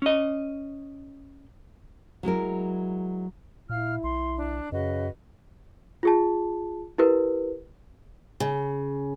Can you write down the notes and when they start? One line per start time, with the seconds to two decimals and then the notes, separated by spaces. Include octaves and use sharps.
0.02 C#4 D#5
2.23 F#3 G#3 E4 A#4
3.70 A#2 E4 F5 F6
4.04 B1 C6
4.36 D4
4.72 F#2 C#3 F#4 B4 D#5
6.03 F4 G#4 A5
6.98 E4 G4 A#4 B4
8.40 C#3